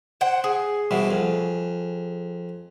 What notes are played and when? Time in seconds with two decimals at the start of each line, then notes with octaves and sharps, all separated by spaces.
0.21 C5 F#5 G5
0.44 G#4
0.91 C2 B2 E3
1.11 F2